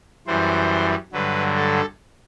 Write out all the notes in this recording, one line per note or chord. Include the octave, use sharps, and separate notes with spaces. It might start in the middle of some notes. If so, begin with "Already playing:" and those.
F#2 E3 G3 C5
G2 D3 F#3 B4
A4